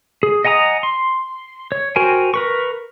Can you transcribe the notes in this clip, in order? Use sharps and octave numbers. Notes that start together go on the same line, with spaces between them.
G#4
D#5 F#5 G#5 A#5 D#6
C6
C#5
F#4 A#4 C5 G5 G#5
A#4 B4 C#6